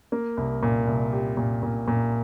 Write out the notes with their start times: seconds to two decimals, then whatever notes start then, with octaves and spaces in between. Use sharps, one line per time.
0.12 A#3
0.37 C2
0.63 A#2
0.87 C2
1.13 G4
1.37 A#2
1.63 A#2
1.88 A#2